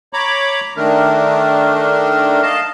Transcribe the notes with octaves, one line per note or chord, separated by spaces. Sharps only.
C#5 A#5 B5 D6
D#3 A3 D4 A#4
D#5 F5 A5